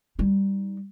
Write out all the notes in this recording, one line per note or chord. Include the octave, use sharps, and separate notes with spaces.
G3 D#4